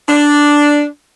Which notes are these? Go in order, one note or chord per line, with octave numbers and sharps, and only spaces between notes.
D4